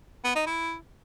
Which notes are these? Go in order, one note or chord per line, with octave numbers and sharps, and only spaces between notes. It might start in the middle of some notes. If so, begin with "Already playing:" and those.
B3
D#4
E4